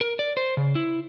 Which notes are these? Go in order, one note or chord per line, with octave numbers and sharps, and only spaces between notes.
A#4
D5
C5
C#3
E4